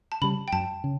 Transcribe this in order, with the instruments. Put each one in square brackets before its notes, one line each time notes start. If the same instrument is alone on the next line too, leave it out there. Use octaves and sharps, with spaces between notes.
[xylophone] A5
[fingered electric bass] C#3 G3 [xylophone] B5
[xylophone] G5
[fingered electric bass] F#2 [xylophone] A5
[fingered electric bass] C#3